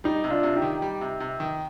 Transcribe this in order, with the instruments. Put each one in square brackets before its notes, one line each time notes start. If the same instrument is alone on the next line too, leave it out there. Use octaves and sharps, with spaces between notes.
[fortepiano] G3 [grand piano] D#4
[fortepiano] C3
[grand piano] D4 F4
[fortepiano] C3
[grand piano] D#4 G4
[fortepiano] D#3
G3
C3
C3
D#3